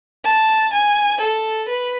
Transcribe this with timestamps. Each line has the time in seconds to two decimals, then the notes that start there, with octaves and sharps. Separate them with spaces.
0.25 A5
0.73 G#5
1.21 A4
1.68 B4